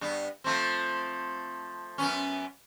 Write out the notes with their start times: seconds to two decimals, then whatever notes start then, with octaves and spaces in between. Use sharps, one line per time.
0.01 G2 B3
0.44 F3 A3 C4
1.98 F#2 B3 C#4